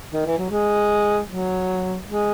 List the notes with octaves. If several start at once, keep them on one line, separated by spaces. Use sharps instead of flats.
D#3
E3
F#3
G#3
F#3
G#3